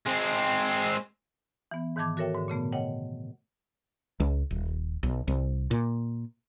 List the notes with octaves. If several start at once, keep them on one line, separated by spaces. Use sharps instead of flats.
G#3 C4
E3 B3
G#2 D#3 E3 A5 D6 G#6
F#4 A4 A#4 C#5 E5 G5
G#2 D3
A#2 C#3 A3 B3
C#5 D#5 F#5 G5
C#2
D#1
B1
C2
A#2